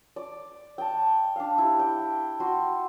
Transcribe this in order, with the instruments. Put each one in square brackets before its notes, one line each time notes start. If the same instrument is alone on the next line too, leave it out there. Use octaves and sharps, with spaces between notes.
[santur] D5
G5 A5
D4 F5
E4 G4
G5
F#4 C6 C#6